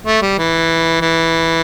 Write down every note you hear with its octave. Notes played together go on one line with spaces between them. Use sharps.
A3
G3
E3
E3